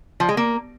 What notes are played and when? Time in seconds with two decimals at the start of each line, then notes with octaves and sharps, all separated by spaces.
0.20 F3
0.29 G#3
0.37 A#3